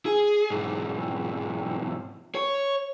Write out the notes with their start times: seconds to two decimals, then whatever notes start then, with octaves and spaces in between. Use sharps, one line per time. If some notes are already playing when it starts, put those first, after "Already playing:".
0.06 G#4
0.50 B1 G#2
2.35 C#5